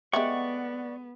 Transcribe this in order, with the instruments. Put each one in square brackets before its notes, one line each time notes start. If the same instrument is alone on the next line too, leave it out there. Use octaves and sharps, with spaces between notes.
[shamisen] G#3 A3 G4 [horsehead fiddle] B3 [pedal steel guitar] D5 F#5 C#6 [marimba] E5